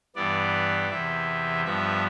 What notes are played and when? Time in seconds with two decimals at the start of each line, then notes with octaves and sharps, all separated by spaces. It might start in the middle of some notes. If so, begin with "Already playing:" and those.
0.16 G2 E3 B3 D5
0.90 E2 C3 E3 E5
1.64 G2 F3 B3 E5